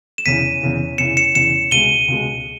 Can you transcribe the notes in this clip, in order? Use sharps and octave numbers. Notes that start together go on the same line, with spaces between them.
E7
E2 C#3 E3 B6 D#7
E2 C#3 E3
E2 C#3 E3 C#7 E7
C#7 E7
E2 C#3 E3 C#7 E7
C#2 B2 G#3 D#7 G7
C#2 B2 G#3